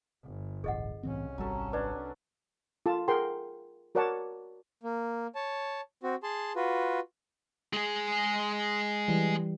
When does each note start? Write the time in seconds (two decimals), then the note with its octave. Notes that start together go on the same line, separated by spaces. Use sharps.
0.24 G1
0.64 D1 A1 G#4 D#5 F#5
1.03 C2 A2 E3 C4 C#4
1.38 G#1 F#3 G3 A4
1.73 D4 B4 D5
2.86 F4 A4 A5
3.08 G#4 A#4 F#5 G5 C6
3.95 F#4 A#4 C#5 D5 F#5 A5
4.83 A#3
5.35 C#5 A5
6.03 C4 F#4
6.23 G#4 A5 C6
6.56 F4 F#4 B4
7.73 G#3 G#4
9.08 E3 G3